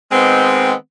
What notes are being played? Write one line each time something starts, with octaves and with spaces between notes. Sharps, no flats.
D#3 G#3 B3 C4